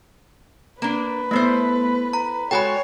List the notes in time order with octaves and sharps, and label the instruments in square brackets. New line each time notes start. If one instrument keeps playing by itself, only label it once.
[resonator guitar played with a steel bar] A#3 D4 [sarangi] B4
[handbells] A3 B3 [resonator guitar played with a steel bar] E4 A4 C5
[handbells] A#5
[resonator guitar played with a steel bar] G#3 F#4 A4 [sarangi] C#5 [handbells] G5 G#5 B5